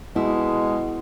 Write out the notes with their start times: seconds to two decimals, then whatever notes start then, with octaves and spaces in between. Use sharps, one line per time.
0.16 B2 G#3 E4